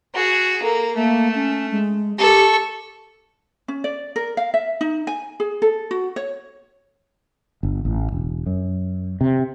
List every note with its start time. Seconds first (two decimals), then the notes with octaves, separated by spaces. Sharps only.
0.15 F#4 G#4
0.62 A#3 A4
0.96 A3 A#3
1.35 C#4
1.71 G#3
2.18 G4 A4 C#6
3.68 C#4
3.84 D5
4.16 A#4
4.37 F5
4.54 E5
4.81 D#4
5.07 G#5
5.40 G#4
5.62 A4
5.91 F#4
6.16 C#5
7.63 G1
7.85 A1
8.12 E1
8.46 F#2
9.21 C3